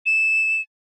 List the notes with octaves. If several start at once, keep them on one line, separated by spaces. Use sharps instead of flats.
E7